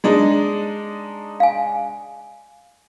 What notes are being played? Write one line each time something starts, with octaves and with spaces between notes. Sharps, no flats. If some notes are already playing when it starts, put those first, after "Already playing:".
G#3 D4 D#4
F5 G#5